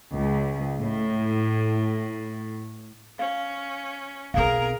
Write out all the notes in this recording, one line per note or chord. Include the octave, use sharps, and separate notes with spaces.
C#2
A2
C#4 F5
B1 C4 G#4 A#4 F5